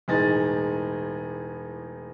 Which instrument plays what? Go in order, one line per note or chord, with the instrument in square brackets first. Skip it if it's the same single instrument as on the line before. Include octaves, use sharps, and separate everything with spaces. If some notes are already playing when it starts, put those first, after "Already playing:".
[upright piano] E1 A2 D#4 G#4 A6